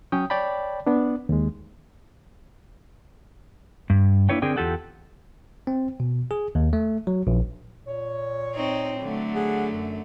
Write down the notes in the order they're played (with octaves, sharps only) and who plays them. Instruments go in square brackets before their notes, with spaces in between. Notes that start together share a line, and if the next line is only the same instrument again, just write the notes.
[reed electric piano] F#3 C#4 C#5 G5 D#6
C#5 D5 G5 A5 B5
B3 D4
D#2 G#3
[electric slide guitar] G2
A#3 D4 E4 B4 C#5 G5
D3 C4 G#4 A#4 D5 G5
E2 F4 G4 A4 F#5 G5
[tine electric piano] C4
B2
G#4
D#2
A3
F#3
A#1
[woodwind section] A#2 C#5
[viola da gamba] C4 D#4
D3 F#3 A3
[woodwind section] G#4 F#5
F#2